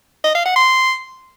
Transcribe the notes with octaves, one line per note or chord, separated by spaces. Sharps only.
D#5
F5
F#5
C6